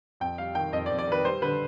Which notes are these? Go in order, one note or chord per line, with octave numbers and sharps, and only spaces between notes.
F2 G5
G3 F5
D#3 G5
F2 D#5
D5
F2
D5
D#3 B4
G3 C5
D3 B4